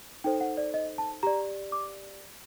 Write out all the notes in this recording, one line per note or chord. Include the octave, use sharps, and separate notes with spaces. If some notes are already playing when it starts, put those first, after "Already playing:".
D#4 A4 C5 G5
F#5
D5
D#5
A5
G4 D5 A#5
D6